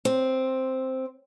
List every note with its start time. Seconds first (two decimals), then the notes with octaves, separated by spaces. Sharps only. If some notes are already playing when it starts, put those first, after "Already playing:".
0.05 C4